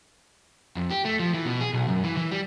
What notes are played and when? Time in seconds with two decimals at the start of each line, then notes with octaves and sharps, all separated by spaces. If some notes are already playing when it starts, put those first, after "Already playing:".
0.76 F2
0.90 G4
1.05 A3
1.20 F3
1.34 E3
1.46 B2
1.61 G#4
1.73 B1
1.88 F#2
2.04 E3
2.17 E3
2.31 G3